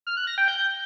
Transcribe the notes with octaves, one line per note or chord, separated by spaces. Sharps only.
F6
F#6
A#6
G5
G6